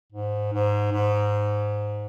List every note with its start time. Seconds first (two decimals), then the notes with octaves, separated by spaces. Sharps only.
0.12 G#2
0.53 G#2
0.92 G#2